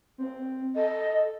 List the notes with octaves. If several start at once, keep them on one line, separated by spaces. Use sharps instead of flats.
C4
A4 D#5